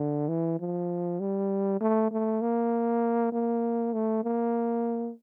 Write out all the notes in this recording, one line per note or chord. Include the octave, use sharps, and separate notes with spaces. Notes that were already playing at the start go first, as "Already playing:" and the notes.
Already playing: D3
E3
F3
G3
A3
A3
A#3
A#3
A3
A#3